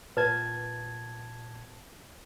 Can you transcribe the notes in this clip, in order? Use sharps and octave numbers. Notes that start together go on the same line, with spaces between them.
A#2 B4 A5 G#6